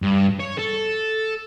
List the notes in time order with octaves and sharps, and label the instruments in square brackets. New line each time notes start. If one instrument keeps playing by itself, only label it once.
[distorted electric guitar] G2
C#5
A4